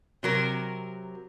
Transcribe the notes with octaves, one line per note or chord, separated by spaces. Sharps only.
C3 F#3 A#4